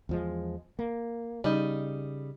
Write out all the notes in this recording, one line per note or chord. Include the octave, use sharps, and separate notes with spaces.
E2 F3 G#3
A#3
C#3 G3 D#4